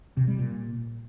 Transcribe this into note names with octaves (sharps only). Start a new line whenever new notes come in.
C3
G3
A#2